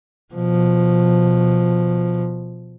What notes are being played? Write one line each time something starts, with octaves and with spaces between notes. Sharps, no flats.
B2 F3